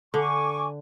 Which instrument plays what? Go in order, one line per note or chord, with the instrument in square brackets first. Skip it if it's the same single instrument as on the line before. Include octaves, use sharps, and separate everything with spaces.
[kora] D3 [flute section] G#5 C#6 D6